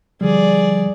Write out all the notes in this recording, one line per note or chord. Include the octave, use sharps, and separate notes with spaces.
D3 F3 G3 G#4 D5